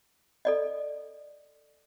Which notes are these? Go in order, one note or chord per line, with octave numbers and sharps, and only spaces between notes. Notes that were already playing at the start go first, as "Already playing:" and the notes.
A4 D5 D#5